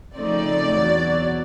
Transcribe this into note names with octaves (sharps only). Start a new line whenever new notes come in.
C#3 F3 A3 C4 D#4 D5
E2 B2 F#3